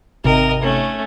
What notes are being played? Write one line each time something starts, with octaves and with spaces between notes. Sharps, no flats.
G#1 C3 A#4 D#5
A3 C#4